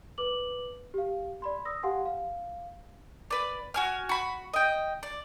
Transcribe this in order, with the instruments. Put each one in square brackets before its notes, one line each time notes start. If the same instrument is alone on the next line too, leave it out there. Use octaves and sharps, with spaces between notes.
[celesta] B4 D6 F#7
G4 F5
D5 B5 C6
D#6 E6 A#6
G4 F5 F#5 G#5 C6
F5
[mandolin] B4 D5
F#4 G#5 F6
F#4 B5
D#5 G5
D5